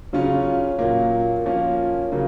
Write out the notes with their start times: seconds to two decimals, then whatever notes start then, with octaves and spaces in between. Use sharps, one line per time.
0.13 C#3 F#3 C#4 F4
0.79 A#2 F#3 A#3
1.46 F3 A#3 C#4 F4
2.12 C#3 F#3 A#3